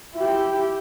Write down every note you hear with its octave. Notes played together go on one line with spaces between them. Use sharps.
E4 G4